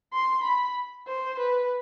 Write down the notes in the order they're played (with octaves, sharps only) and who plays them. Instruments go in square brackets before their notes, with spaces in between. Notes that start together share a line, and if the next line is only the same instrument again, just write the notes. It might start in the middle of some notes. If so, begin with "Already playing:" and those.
[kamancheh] C6
B5
C5
B4